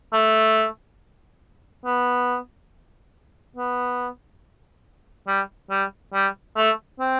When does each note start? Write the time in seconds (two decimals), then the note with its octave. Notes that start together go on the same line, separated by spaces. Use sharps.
0.13 A3
1.85 B3
3.56 B3
5.27 G3
5.70 G3
6.14 G3
6.57 A3
6.99 C4